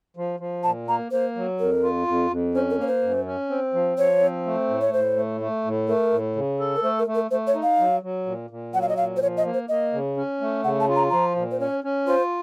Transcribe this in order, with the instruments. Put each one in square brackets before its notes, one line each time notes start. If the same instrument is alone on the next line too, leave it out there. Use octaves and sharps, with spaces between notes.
[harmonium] F3
F3
[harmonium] A#2 [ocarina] A5
[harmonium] A#3 [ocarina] A#5
[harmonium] A#3 [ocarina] C5
[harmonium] F#3
[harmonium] F2 [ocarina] A#4
[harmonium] F4
F2
F2
[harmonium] C#4 [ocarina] C5
[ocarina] A#4
[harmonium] A#3 [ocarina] C#5
[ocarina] C5
[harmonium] F#2
C#4
C4
F3
[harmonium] F3 [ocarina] C#5
[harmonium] C4
A3
A2
[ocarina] C#5
[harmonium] A2 [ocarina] C5
[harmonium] A3
A3
A2
[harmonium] A3 [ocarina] A#4
[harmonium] A2
C#3
A4
[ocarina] A#4
[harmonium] A3 [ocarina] C5
[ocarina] A#4
[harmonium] A3
[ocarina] A#4
[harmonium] A3 [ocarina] C5
[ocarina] C#5
[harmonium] D#4
[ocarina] F5
[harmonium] F#3
F#3
A#2
A#2
[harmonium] F#3 [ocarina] F#5
[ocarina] F5
D#5
[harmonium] A#2 [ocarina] F5
[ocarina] C5
[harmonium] F3 [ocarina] C#5
[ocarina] D#5
[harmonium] A#3
[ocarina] C5
[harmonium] A#3 [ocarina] D#5
[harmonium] C#3
C#4
A3
[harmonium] C#3 [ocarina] F#5
[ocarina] A5
[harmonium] F4
[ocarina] A#5
[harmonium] F3 [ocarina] A#5
[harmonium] A#2
[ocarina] C5
[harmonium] C#4 [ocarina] C#5
[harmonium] C#4
[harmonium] F4 [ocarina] C5